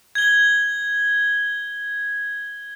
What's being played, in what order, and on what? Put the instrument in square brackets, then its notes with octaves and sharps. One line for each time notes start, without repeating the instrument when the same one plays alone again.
[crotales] G#6 G7